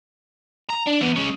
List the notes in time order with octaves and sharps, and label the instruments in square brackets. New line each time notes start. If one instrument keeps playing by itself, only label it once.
[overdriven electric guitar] A#5
D4
E3 B3
G#3 C#4